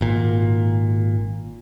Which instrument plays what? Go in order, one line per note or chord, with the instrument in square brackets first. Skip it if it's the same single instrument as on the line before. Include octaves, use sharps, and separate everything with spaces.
[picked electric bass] G#1 A#2